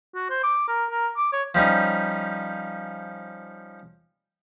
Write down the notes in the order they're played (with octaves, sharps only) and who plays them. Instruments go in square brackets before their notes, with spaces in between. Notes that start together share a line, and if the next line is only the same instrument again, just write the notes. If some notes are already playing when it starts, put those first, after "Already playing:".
[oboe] F#4
C5
D6
A#4
A#4
D6
C#5
[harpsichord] F3 G3 C#4 D#4